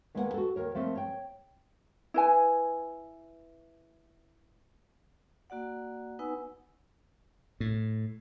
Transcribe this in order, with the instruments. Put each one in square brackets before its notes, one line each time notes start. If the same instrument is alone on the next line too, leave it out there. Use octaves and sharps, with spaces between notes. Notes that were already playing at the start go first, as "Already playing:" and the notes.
[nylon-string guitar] D#2 G#3 A#3 B3 D5 F#5
F#4 A4
D#2 A#4 C#5
F3 A3 A#3 C4
C#5 G5
[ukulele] E4 B4 G#5
[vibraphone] A#3 F#4 D5 F#5
B3 D#4 B4 F#5 G#5 E6
[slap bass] A2